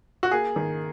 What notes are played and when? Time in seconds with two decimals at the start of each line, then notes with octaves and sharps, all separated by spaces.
0.23 F#4
0.31 A#3 G#4
0.56 D#3